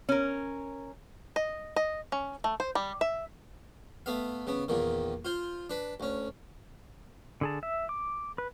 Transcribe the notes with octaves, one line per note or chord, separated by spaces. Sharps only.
C#4 A#4
D#5
D#5
C#4
A3
C5
G3
E5
A3 B3 F5
C#3 B3
E2 A#2 D#3
F4 C5
D4 B4
D2 C#4
D3 G#4 A5
E5
D6
B4